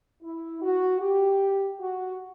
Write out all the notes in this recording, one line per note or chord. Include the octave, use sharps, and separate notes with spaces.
E4
F#4
G4
F#4